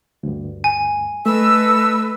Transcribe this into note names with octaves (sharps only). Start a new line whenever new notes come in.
D2 G2
G#5
A3 A4 B4 D#5 E6